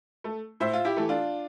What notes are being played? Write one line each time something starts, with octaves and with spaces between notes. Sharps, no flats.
A3
A2 C5 E5
F4
E4 G4
E3 A3
D4 F4